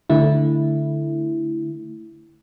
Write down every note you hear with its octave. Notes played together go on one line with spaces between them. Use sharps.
D3 A3 E4